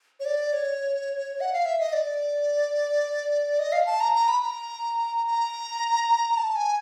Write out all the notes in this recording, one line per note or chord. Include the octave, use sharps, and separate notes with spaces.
C#5
D5
C#5
F#5
F5
E5
D#5
D5
D#5
F5
A5
A#5
A#5
B5
A#5
A#5
A5
G#5